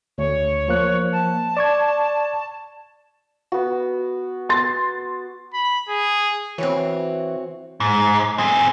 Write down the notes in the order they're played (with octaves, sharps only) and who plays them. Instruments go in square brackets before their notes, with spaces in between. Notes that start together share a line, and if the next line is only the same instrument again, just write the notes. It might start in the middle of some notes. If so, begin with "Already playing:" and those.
[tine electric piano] D2 [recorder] C#5
[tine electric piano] F3 A#3 F#6
[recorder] A5
[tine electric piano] D5 C#6 G#6
[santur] B3 F#4
[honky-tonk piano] C6 A6
[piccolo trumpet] B5
G#4
[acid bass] E3 [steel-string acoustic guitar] C4 F#4 C#5
[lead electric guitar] G#2
C4 G#4